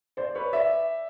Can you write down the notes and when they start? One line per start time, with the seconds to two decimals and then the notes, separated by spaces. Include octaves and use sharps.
0.17 C5 D5
0.35 B4 C#5
0.53 D5 E5